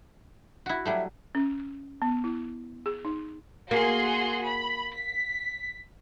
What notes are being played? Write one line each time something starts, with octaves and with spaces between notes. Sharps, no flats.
E4 F#4
F#3 G3 A3 E5
C#4
B3
E4
G#4
D#4
A#3 F#4 G#4 C6
B5
B6